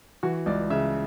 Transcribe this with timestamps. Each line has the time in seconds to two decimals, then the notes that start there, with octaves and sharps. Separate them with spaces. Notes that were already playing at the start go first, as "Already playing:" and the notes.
0.23 E3 F#4
0.46 C#2 D5
0.70 C#3 E5